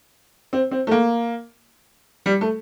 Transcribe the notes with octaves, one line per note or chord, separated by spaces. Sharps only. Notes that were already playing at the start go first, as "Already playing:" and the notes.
C4
C4
A3
A#3
G3
A3